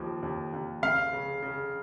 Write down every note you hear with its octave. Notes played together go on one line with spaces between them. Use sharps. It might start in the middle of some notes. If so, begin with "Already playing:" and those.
Already playing: D#2 F3
D#2
D#2
C#2 F5
C#3
C#3